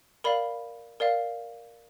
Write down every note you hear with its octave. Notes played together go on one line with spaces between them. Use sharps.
A#4 D5 F5 B5
A#4 D5 F5